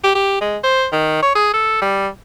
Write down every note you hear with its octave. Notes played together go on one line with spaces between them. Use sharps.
G4
G4
G#3
C5
D#3
C#5
G#4
A4
G3